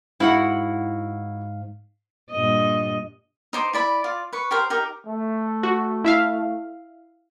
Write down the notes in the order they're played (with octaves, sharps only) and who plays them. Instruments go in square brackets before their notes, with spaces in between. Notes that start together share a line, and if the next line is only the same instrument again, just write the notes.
[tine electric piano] G#2 F5 [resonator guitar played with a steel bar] E4 F#4 F#5
[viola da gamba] G2 A#2 D#5
[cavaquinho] D#4 C5 D6
E4 D5 B5
F4 D5
B4 C#6
G4 A#4 C5
D#4 G4 A#4
[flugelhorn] A3
[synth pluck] F#4
E4 E5 F5